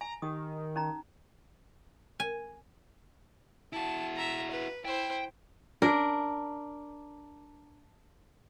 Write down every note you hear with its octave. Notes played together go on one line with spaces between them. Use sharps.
G#5 A#5
D#3 G4 D#6
C#4 D#4 A#5
G#5
E4 F#4 A5
E5 A#5
B4
E4 C5 G5
D4 A#4